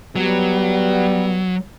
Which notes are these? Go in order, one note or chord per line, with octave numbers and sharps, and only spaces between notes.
F#3 G3 B3